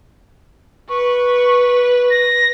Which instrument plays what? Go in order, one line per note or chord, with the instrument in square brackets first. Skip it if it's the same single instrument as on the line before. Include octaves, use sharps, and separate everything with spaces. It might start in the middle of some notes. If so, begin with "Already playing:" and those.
[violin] B4 [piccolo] C#6
[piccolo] A#6